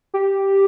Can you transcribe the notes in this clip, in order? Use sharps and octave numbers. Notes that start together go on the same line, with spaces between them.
G4